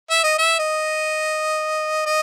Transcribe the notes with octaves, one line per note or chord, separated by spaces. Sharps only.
E5
D#5
E5
D#5
D#5